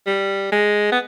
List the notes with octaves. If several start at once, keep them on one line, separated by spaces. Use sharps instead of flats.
G3
G#3
B3